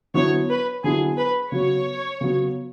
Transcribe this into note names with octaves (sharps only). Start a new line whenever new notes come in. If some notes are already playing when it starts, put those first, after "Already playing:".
D3 F#3 B3 E4 C#5
B4
D3 F#3 B3 E4 G#4
B4
C#3 F#3 B3 F#4 C#5
C#3 F#3 B3 F#4